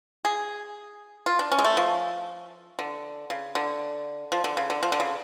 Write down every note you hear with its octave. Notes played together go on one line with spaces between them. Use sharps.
G#4
F4
D4
C#4
G#3
A3
F3
D3
C#3
D3
F3
D3
C#3
D3
F3
D3
C#3